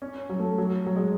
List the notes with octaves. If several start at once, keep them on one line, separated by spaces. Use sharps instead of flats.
C#4
F#3
A3
F#3
F#3
G#3